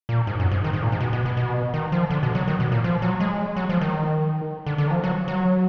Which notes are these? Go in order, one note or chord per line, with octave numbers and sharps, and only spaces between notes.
A#2
G#2
F#2
G#2
D#3
G#2
A#2
G#2
B2
B2
B2
B2
D#3
F3
D3
B2
F#3
D#3
B2
A#2
F3
F#3
G#3
F#3
F3
D#3
D3
D3
D#3
F3
F#3
F#3